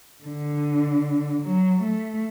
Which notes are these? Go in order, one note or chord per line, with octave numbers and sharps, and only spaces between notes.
D3
F#3
A3